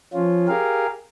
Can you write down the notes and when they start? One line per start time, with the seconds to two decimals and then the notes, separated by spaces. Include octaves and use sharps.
0.14 F3 C#4 F4
0.48 G4 G#4 A#4 F5